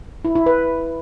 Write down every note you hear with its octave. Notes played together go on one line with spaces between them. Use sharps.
E4
E4
B4